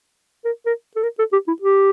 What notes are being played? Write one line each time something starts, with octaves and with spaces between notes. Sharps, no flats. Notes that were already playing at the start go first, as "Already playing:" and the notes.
A#4
A#4
A4
A#4
A4
G4
E4
G4